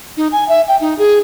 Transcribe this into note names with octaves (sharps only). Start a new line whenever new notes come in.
D#4
G#5
E5
G5
D#4
G#4